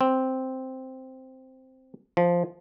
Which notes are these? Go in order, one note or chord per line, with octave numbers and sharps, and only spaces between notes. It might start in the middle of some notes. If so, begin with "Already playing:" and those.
C4
F3